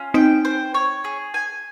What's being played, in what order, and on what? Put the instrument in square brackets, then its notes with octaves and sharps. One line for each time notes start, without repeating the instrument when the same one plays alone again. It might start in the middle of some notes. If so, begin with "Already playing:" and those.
Already playing: [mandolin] C#4 F4
[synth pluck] C4 D#4 [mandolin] G5
[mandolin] C5
C#5
G#4
G#5